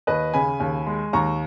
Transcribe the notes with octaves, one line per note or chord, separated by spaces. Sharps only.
D#2 B4 D#5
C#3 G#5 B5
D#2
G#3
D#2 A#5 C#6